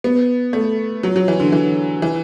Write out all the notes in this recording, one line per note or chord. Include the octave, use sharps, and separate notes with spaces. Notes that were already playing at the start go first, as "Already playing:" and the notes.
B3
A3
F#3
F#3
E3
D3
E3
E3